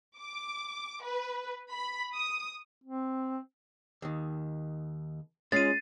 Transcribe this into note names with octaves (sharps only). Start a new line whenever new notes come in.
D6
B4
B5
D#6
C4
D#2 D#3
G#3 C#4 F4 A6 C7 D#7